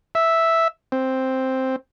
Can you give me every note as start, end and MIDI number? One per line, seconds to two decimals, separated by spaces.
0.15 0.68 76
0.92 1.76 60